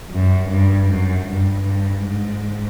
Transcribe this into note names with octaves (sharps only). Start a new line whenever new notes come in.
F#2
G2
F#2
G2
G2
G#2